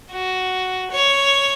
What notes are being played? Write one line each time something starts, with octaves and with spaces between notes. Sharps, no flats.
F#4
C#5